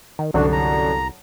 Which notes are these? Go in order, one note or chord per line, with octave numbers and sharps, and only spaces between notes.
D#3
C2 F#2 D3 D4 F#4
A#5